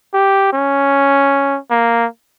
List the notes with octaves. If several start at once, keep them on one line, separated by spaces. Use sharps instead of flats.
G4
C#4
A#3